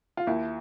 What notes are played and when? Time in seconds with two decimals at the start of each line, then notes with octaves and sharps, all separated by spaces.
0.17 F4
0.27 D#2 E4